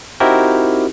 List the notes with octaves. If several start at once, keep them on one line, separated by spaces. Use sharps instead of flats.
C4 D#4 E4 F#4 G4 A#4